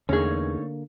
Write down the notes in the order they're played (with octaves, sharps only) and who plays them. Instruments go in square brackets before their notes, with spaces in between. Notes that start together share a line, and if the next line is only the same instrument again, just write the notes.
[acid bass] E2 [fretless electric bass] D3 A#3 [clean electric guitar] A3 D#4 C#5 [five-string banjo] C#4 G#4